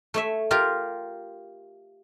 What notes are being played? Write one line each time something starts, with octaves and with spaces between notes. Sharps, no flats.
A3 C#5 E5
F4 G4 A#4